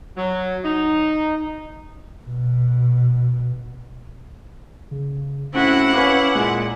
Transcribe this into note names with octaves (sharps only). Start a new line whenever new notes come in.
F#3
D#4
B2
C#3
A2 C4 C#4 E4 F#4 F#5
C#4 B4 F5 D6
A#2 G#3 G#5